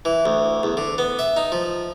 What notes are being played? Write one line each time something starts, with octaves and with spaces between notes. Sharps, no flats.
E3
D2
E2
D3
B3
E5
D#4
F3